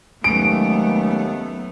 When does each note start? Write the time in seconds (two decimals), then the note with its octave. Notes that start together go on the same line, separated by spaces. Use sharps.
0.24 D#2 F#3 G#3 A3 B3 C#4 D7